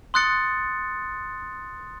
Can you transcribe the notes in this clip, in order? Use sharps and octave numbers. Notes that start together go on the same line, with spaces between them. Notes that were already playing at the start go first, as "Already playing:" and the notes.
C6 D#6 F#6 A6 C#7